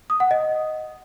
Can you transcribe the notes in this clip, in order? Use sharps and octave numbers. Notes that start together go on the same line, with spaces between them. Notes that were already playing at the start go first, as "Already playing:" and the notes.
D#6
F#5
D#5